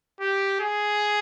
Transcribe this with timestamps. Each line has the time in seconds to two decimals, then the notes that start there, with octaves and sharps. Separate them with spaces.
0.20 G4
0.60 G#4